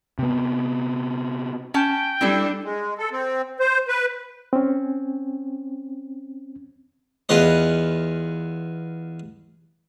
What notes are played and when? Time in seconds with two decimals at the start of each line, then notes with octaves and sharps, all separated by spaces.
0.19 C3 B3
1.74 C#4 G5 A5
2.21 G3 C4 D4 E4 A4
2.62 G#3
2.98 A4
3.12 C4
3.60 C5
3.88 B4
4.53 C4 C#4
7.29 E2 F4 B4 D#5